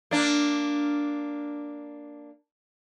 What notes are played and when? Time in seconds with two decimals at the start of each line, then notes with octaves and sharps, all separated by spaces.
0.11 A#3 D4